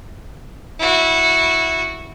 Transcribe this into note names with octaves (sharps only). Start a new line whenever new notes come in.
E4 F#4